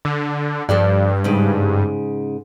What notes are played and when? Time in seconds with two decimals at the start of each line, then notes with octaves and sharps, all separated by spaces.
0.05 D3
0.69 G2 F3 A4 D5
1.24 G#2 C#3